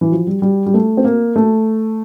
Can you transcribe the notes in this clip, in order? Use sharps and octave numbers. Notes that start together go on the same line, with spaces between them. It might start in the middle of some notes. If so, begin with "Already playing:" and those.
E3
F3
G3
G3
G3
A3
C4
A#3
A3